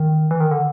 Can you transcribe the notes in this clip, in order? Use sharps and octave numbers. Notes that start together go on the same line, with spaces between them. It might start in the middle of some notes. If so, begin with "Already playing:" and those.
Already playing: D#3
E3
D#3
D3